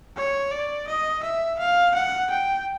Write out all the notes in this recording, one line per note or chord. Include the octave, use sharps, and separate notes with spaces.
C#5
D5
D#5
E5
F5
F#5
G5